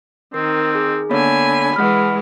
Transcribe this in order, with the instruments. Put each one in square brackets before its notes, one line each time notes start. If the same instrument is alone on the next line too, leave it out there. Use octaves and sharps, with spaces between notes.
[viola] D#3 [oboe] C4 [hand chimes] A#4
[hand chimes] G#4
[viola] D3 G#5 [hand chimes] A#3 B3 C#5 [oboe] B5
[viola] E3 G#3 [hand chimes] F#5 F6